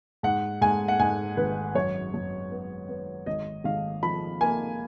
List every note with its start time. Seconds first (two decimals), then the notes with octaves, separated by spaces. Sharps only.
0.23 G#2 F#5
0.61 G#2 G#5
0.88 F#5
0.99 G#2 G#5
1.37 G#1 B4
1.75 F#2 C#5
2.14 F#2
2.51 B3
2.88 B3
3.26 G#1 D#5
3.64 G#1 F5
4.03 F3 B5
4.41 A#3 G#5